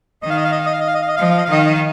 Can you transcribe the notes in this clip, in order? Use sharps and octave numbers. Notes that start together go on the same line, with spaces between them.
D#3 D#5
F5
D#5
F5
D#5
F5
D#5
F5
D#5
F5
D#5
F5
D#5
F3 F5
D#5
F5
D#5
F5
D#3 D#5
F5
D#5
F5